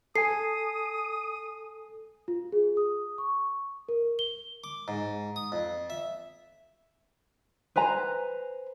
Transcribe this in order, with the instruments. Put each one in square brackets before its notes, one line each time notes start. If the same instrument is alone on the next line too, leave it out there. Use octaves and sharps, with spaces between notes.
[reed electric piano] A4 G#5 [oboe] D#6 [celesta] C7
[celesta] F4
G#4
D#6
C#6
A#4
G7
[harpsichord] D6
G#2
D#6
F2
E5
[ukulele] B4 C5 G#5 A#5